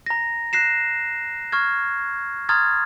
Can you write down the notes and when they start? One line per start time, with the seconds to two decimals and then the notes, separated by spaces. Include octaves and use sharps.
0.06 A#5 A#6
0.53 F#6 A#6 C7 E7
1.52 C#6 F6 G#6
2.49 A#5 C6 D#6 F6 G#6 A6